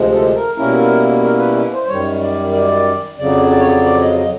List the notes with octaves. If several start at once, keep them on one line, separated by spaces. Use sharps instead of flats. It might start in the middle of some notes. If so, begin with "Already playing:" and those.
Already playing: D2 C3 F3 G#3
A4
A#4
B2 G3 A#3 C#4 E4 A#4
A#4
B4
B4
C5
C5
F#2 D#3 G3 C#5
D5
D5
F2 C#3 F#3 D5
D5
C#5
D5
D5
D#5
D#5